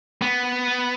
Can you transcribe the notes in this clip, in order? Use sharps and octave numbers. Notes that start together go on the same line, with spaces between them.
B3